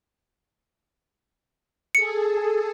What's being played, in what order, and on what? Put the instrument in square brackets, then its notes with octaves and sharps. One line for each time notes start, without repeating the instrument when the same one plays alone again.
[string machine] G#4 A4 [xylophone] C#7